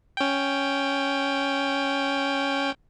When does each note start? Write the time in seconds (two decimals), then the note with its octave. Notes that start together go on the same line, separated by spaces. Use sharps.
0.17 C#4 G5